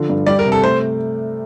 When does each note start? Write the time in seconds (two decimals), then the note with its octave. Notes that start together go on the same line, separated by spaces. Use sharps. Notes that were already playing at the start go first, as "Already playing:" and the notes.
Already playing: D3 F3
0.09 G2
0.26 G3 D5
0.39 A#4
0.46 C3
0.52 A4
0.63 A3 C5